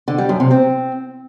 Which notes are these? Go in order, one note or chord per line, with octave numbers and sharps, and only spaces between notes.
D3
G3
F#2
C3
C4